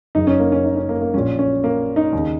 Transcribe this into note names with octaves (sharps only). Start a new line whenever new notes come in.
F#1 F#2 C#3 D#4
C#4
A#3
C#4
D#4
C#4
A#3
A#3
A#1 A#2 C#4
C#4
A#3
D#4
D#2
C#3